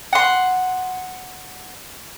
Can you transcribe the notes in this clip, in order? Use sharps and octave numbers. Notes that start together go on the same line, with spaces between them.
F#5 C6